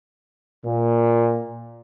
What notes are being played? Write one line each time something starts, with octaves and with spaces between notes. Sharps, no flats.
A#2